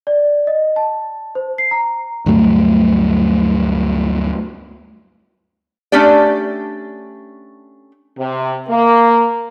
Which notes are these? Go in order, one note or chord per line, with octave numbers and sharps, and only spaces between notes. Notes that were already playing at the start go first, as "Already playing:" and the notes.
D5
D#5
A5
C5
C7
A#5
D2 G2 F#3 A3
A3 C#4 D4 G4 D5
C3
A#3